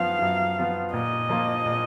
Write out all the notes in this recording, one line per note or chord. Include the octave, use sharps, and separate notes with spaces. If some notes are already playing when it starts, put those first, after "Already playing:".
Already playing: F#2 F3 B3 F4 F5
F#2
F3 B3 F4
A#2 D#5
F3 A#3 F4
A#2